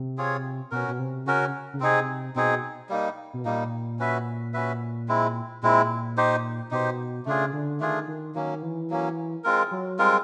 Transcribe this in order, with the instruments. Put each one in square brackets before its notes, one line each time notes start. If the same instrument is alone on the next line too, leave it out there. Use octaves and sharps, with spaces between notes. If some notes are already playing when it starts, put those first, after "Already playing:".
Already playing: [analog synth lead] C3
[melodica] C4 F4 G#4 C#5
[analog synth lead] B2 [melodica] C#4 F#4 A#4
[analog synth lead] B2
C3
[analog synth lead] C#3 [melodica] C#4 F#4 A#4
[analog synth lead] C#3
[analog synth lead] C3 [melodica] C4 D#4 G#4
[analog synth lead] B2 [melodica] C4 D#4 G#4
[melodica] G3 A#3 D#4
[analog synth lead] B2
[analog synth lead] A#2 [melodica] G3 A#3 D#4
[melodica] C#4 F#4 B4 E5
C#4 F#4 B4 E5
G#3 C4 E4
[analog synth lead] A#2 [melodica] G#3 C4 E4
[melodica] D#4 G4 C5
[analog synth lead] B2 [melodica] D#4 G4 C5
[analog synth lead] C#3 [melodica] A3 D4 F4 G#4
[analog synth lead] D3
[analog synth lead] D#3 [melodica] A3 D4 F4 G#4
[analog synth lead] D#3
[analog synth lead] D#3 [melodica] F#3 A#3 C#4
[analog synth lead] E3
[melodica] F#3 A#3 C#4
G#3 C4 F4 A#4
[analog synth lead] F#3
[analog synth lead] G3 [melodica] G#3 C4 F4 A#4